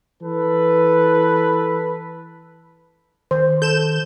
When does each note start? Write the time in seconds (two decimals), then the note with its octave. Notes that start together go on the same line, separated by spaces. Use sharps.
0.22 E3 A4 B4
3.31 D#3 C5
3.62 A4 G6 E7